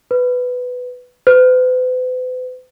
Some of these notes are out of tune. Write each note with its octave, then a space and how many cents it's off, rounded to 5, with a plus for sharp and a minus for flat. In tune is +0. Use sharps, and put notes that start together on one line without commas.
B4 +10
B4 +45